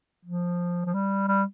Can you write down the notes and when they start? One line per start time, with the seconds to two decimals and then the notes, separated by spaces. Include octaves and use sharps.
0.25 F3
0.86 F3
0.94 G3
1.28 G3